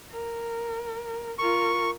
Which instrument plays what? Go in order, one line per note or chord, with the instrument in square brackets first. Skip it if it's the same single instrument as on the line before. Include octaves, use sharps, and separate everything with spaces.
[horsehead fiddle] A#4
[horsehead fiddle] F4 A#4 [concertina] C#6